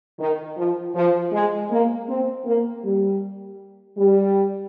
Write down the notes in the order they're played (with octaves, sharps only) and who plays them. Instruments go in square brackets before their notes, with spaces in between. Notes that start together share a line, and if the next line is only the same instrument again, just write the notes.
[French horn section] D#3
F3
F3
G#3
A#3
C4
A#3
G3
G3